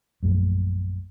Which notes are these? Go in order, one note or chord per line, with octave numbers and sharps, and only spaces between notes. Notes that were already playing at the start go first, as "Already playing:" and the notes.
A#1 F#2 A3